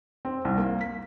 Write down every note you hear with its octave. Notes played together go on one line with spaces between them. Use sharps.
C4
C2
A#3
B6